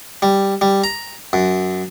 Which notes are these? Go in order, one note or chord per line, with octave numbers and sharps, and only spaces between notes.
G3
G3
A#5
F#2